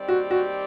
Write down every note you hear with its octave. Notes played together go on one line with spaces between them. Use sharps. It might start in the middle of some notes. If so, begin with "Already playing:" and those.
Already playing: D#3 G3 C4 G4 D5
F#4
F#4